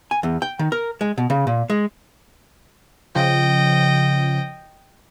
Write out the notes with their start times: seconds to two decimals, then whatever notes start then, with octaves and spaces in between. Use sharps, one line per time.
0.11 G#5
0.23 E2
0.42 G5
0.59 D#3
0.72 A#4
1.01 G#3
1.18 B2
1.30 C#3
1.47 A#2
1.70 G#3
3.15 C#3 F3 D#5 G5